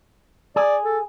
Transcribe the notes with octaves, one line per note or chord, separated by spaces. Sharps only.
G#4 D5
A4